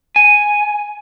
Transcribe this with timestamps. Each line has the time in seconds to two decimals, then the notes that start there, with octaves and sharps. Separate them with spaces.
0.16 G#5